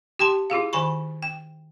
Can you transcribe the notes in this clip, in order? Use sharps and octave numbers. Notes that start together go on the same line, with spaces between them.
G4 G5 A5 C6
E4 F4 G#4 F5
D#3 G#5 B5 C#6
G5